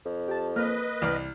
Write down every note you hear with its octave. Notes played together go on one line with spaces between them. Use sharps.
F2
G4 A5
A#3 B4 D#5 F6
C2 D5 F6